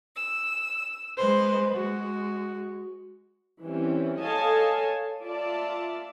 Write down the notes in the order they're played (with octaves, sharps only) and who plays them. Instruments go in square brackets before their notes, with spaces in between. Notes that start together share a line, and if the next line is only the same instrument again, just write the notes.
[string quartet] E6
[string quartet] G#3 B4 [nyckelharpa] C5
[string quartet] G#3 [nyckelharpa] F#4
[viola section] E3 G3 C4 C#4
A4 C#5 D#5 F5 G#5 A5
F4 D5 E5 A5